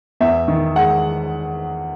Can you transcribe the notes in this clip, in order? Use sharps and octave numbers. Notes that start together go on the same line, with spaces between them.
E2 E5
D#3
G#3 F#5